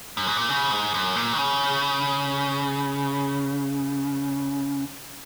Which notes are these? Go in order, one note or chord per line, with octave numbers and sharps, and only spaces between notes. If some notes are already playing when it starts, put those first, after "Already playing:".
F#2
G#2
A#2
C#3
G#2
F#2
A#2
D#3
C#3